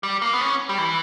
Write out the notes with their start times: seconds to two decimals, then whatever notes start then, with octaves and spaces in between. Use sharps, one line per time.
0.03 G3
0.22 A#3
0.33 B3
0.41 C#4
0.69 G3
0.78 E3